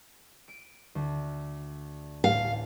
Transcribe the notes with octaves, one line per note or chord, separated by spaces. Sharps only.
D7 D#7
D2
A1 F5